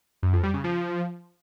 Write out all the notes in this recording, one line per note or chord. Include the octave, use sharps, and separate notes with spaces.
F#2
F2
G3
C#3
F3